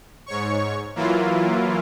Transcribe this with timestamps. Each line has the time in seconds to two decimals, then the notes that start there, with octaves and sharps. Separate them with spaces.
0.26 G#2 C#5 C#6
0.96 E3 F#3 A#3 E4 F4